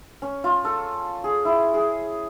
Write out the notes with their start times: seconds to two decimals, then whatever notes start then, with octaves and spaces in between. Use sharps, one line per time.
0.22 C#4
0.44 F4
0.65 A4
1.24 G#4
1.45 E4
1.74 G#4